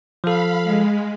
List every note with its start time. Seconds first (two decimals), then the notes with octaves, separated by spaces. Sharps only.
0.24 F3 A4 F5 B5
0.64 G#3